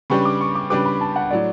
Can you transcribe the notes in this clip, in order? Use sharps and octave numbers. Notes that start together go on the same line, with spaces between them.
C#3 G3 D4 G4 B4 C#6
D6
C#6
D6
C#3 G3 D4 G4 B4 D6
B5
A5
F#5
A2 F#3 D5